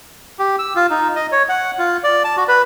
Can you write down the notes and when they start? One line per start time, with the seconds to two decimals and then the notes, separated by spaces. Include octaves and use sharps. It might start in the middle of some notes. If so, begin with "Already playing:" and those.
0.39 G4
0.59 E6
0.76 F4
0.91 D#4
1.15 D#5
1.32 C#5
1.49 F#5
1.79 F4
2.04 D5
2.24 A5
2.37 F#4
2.48 B4